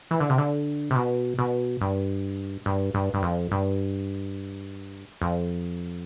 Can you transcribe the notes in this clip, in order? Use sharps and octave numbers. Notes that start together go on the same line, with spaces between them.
E3
D3
C3
D3
C3
B2
B2
G2
G2
G2
G2
F2
G2
F2